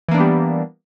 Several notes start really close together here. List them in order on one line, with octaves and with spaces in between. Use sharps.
E3 A#3 D4 B3 G3